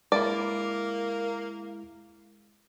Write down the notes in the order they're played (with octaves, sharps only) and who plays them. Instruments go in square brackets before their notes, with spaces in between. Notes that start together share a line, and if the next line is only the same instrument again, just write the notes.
[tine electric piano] G#3 E4 [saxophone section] A#3 [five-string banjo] D5